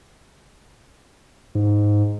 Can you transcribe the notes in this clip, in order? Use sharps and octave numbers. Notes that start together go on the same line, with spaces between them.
G#2